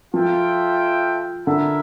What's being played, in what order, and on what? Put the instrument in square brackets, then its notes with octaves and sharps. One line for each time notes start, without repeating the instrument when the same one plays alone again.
[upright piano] F3 [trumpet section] F4 A4 E5 G5
[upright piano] D3 [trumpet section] E4 A#4 E5